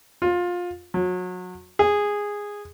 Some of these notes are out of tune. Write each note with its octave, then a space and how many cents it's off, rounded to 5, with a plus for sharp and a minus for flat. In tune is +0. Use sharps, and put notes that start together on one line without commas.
F4 +20
F#3 -30
G#4 -10